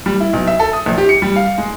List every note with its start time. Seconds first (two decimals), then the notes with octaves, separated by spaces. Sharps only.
0.06 G3
0.20 E4
0.33 B1
0.47 E5
0.60 A4
0.73 D#6
0.86 A#1
0.98 G4
1.09 C#7
1.22 G3
1.36 F5
1.58 G#3